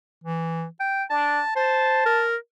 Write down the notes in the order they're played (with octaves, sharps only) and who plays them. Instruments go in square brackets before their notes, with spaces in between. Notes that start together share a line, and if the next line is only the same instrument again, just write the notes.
[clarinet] E3
G5
[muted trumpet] D4 [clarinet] A5
[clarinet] C5 [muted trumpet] A5
[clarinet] A#4